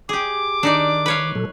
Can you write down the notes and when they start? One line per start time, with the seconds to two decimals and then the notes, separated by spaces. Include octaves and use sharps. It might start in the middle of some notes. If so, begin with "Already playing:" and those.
0.09 G4 G#4 D6
0.63 D#3 D4 D#4 D5
1.06 B4 C#5 F5
1.35 A#2 F#3 A4